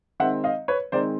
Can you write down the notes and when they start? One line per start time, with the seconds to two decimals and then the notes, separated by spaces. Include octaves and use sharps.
0.20 D#3 G#3 C4 D#4 E5 F#5
0.44 D#5 F5
0.68 B4 C#5
0.92 D#3 G#3 C4 D#4 C5 D5